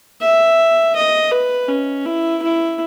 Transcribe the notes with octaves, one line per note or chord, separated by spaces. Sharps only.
E5
D#5
B4
C#4
E4
E4